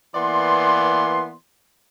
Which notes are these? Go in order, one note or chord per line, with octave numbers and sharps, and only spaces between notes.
E3 A#3 B3 D5 C6